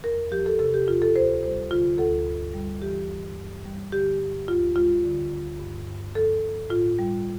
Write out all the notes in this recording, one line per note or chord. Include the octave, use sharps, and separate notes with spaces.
E2 A#4
F3 G4
A4
C3 A4
G4
E2 F4
A4
D2 C5
G3 C5
D3 F4
D2 A4
G2
G3
E3 G4
G2
G2
G3
D3 G4
G2
D2 F4
G3 F4
D3
D2
G2
G2
F3 A4
F3
A2 F4
G3